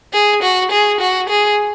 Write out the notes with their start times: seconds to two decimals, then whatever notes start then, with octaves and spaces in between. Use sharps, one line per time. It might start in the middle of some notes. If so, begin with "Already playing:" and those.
0.13 G#4
0.42 F#4
0.71 G#4
1.00 F#4
1.29 G#4